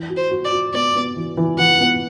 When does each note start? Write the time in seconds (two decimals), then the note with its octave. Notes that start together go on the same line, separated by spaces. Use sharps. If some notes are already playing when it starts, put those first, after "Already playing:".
Already playing: E3
0.10 F#4
0.17 C5
0.31 F#4
0.45 D5
0.52 F#4
0.74 B3 D5
0.95 B3
1.16 E3
1.37 E3
1.58 E3 F#5
1.80 B3